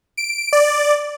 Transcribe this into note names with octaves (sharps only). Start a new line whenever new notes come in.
D7
D5